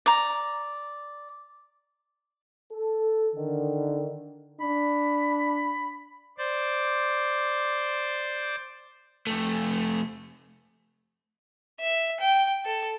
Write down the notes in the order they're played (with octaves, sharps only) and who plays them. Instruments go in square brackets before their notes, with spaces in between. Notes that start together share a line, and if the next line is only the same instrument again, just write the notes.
[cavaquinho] D5 A#5
[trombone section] A4
D3 D#3
[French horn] D4 [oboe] B5
[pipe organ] C5 D5
[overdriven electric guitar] F2 A3
[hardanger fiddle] E5
G5
A4